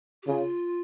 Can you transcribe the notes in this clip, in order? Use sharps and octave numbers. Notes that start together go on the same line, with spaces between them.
G4
C#3 F4